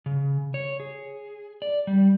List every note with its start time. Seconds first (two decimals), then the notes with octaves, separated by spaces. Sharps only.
0.06 C#3
0.54 C#5
0.80 G#4
1.62 D5
1.87 G3